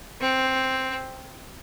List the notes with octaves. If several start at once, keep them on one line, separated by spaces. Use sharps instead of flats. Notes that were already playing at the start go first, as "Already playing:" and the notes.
C4